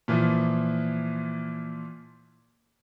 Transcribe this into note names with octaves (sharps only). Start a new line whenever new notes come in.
A#2 E3 F3